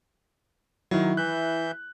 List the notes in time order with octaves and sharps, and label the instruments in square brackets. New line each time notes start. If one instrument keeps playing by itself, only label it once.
[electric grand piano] D#3 F#3 [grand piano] E4
[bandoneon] E3 E5 G6 [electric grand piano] F#6